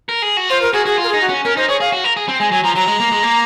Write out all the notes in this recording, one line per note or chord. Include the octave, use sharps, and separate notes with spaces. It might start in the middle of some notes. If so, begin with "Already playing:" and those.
A#4
G#4
F#4
F4 C5
A#4
F#4 G#4
F#4 G#4
F4
A#4
D#4 G#4
F#4
C#4
C#4 A#4
D#4 C5
G#4 C#5
G#4 F5
F#4
A#4
G#4
C4
G#3 G#5
F#3 G#5
F3 A#5
F#3 A#5
G#3
A#3
G#3
A#3